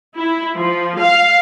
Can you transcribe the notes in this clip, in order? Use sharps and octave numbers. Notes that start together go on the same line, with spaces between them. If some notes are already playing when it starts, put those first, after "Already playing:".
E4
F3
F5